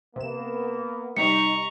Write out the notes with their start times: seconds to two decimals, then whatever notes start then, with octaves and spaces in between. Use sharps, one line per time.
0.16 C3 A#3 B3 E7
1.17 C3 G3 D#4 A#5 C#6 B6 C#7